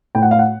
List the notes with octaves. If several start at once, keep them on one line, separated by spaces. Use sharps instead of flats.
A2 G5
F#5
F5
F#5